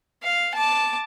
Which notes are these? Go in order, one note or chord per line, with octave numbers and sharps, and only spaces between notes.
F5
A5 D6